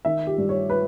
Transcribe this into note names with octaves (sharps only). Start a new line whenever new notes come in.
D#3 E5
G4
G2
C#5
B4